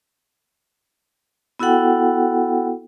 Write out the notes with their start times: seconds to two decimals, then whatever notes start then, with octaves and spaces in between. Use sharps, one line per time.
1.59 B3 E4 F#4 A4 F#5 G5